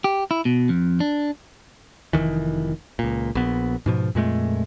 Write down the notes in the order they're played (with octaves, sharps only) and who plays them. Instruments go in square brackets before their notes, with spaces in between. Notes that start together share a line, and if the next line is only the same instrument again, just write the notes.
[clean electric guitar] G4
E4
B2
F2
D4
[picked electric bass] F1 E2 D#3 E3
C#2 A#2
A#1 B3
G#2 B2 F3
F2 A#2 G#3 A3